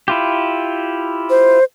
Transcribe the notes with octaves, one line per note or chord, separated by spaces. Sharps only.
E4 F4 G4
C5